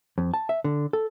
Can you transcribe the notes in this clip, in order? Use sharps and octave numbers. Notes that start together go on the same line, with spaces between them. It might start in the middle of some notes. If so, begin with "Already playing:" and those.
F2
A5
E5
D3
A4